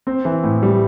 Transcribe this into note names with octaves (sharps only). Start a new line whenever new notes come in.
C4
E3
A2
G3